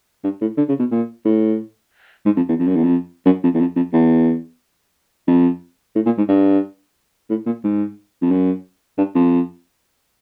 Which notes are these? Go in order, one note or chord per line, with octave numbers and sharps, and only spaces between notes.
G2
A2
D3
C#3
B2
A#2
A2
G#2
F2
E2
F2
F#2
E2
F2
F#2
F2
E2
F2
F2
E2
F2
A2
A#2
G#2
G2
A2
A#2
G#2
F2
F#2
G2
F2